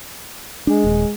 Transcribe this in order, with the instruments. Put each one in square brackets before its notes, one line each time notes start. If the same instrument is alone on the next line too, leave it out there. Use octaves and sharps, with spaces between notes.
[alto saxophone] G#3 [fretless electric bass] D4
[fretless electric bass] D#1